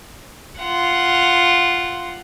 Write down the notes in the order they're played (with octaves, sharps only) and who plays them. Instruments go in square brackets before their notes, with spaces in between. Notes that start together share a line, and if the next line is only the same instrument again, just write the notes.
[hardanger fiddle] F4 F#5